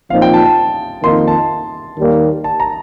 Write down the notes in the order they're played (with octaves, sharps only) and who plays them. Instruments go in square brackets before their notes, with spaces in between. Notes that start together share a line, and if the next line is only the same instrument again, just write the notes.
[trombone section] A#2 F3 C4 D#4 [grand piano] F5
[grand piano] G5
A5
A5
[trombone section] F2 D#3 A#3 D#4 [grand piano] C6
[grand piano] A5
[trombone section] D#2 D#3 G3 A#3
[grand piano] A5
A#5